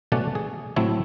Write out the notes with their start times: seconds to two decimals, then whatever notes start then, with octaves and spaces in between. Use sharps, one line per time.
0.12 B2 F#3 A3 C#4 D5 F#5
0.35 G#4
0.76 A2 F#3 A3 C4 E4 C#5